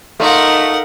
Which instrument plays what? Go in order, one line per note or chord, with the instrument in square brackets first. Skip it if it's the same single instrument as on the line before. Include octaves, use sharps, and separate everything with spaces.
[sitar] A3 [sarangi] D#4 [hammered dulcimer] F4 [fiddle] A#4 F#5